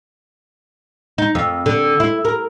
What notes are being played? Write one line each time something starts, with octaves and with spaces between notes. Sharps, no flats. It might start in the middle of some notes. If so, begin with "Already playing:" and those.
D#4
F2
D3
E4
A#4